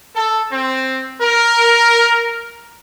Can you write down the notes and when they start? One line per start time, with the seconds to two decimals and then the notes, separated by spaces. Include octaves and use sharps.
0.15 A4
0.51 C4
1.19 A#4